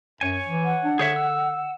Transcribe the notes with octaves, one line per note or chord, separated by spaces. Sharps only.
F#2 C#5 G#5
E3
F#5
D4
D3 G#4 C#5 E5
E6